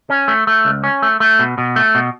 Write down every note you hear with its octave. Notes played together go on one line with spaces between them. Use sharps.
C#4
A3
A3
C#2
C#4
A3
A3
B2
B2
A3
B2